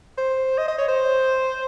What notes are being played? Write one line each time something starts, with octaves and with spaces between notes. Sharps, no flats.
C5
D#5
D#5
C#5
C5